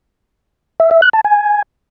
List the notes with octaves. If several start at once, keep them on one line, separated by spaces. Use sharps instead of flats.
E5
E5
F#6
A5
G#5